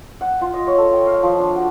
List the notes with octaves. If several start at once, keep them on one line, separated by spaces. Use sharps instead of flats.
F#5
F4
D#5
C#5
A4
G5
F5
F3
D4
F#4